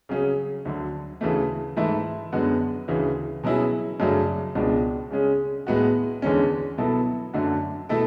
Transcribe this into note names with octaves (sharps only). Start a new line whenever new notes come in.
C#3 F#3 C#4 G#4
D2 D3 F#3
D2 C#3 E3 A3
G#2 E3 A3 E4
F#2 D3 G#3 B3 F#4
D2 C#3 E3
B2 F#3 C#4 E4 G#4
F#2 C#3 F#3 A3 D4
C#2 B2 G#3 B3 D4
C#3 G#3 C#4 G#4
A2 G#3 B3 F#4
E2 D3 G#3 C#4
B2 F#3 B3 E4 A4
F#2 D3 A3 D4 F#4
B2 A3 E4 A4